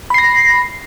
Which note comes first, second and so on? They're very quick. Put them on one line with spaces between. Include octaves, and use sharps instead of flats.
B5 C7 A#6